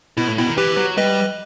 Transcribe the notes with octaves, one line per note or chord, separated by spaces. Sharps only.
B2 E4
A2
B2 E4
D#3
E3 G4 B4
F#3
G3 B4 D#5